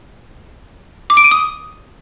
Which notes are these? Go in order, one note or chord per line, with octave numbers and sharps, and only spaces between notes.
D6
D7
D#7
D#6